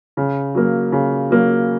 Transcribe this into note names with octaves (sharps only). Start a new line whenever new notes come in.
C#3
F#3 A#3
C#3
F#3 A#3